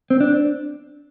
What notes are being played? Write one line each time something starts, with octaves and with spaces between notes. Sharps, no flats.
C4
D4